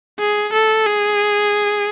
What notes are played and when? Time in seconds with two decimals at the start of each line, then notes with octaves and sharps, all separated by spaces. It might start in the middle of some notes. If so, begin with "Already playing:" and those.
0.19 G#4
0.53 A4
0.86 G#4